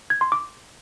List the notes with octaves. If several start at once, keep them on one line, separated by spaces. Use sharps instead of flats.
G#6
C6
D6